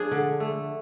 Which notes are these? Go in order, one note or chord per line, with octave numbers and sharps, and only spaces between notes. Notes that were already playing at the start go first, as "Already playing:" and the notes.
Already playing: F3 D4 G#4
D3
A3